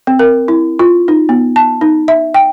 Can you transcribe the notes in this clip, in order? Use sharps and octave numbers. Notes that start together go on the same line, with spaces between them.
C4
A#4
E4
F4
D#4
B3
A5
D#4
E5
G5